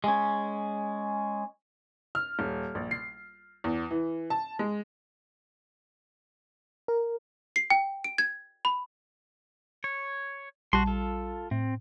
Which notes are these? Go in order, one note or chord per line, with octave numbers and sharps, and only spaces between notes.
G#3 C#4
F6
D#1
A#1
C7
E2
E3
A5
G#3
A#4
C7
G5
D7
G#6
B5
C#5
A#1 G3 F#4 A5 C6
F4 A4
A2 C4